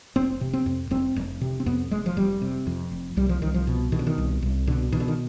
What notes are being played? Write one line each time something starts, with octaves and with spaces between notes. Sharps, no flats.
F1 C4
C3
C4
F2
F1 C4
F1
C3
C4
F2 B3
F1 G#3
F3
F1 G3
C3
F2
F1
C2 G3
F3
C2 D#3
F3
B2
B2 D#3
D3
D#3
C2
C2
B2 D3
B2 D#3
D3
D#3